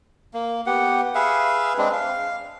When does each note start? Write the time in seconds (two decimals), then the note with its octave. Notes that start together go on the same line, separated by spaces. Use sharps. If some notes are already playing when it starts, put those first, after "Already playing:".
0.34 A#3
0.66 B3 G4 F#5
1.15 G#4 B4 E5 F5
1.78 G#3 C4 D4
1.93 F5